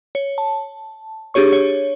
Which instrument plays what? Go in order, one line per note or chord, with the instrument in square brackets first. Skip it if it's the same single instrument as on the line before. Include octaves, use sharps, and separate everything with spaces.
[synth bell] C#5
A5
D4 G4 G#4 C#5 C#6
C#5